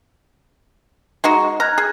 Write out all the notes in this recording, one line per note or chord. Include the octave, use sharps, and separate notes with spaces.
G#3 D#4 F#4
A#5 F6 F#6 G#6
G#4